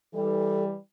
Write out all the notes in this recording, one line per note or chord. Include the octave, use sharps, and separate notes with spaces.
E3 G3 A4